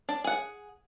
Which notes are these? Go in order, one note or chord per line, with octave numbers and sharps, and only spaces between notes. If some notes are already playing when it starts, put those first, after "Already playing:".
D4
G#4 F#5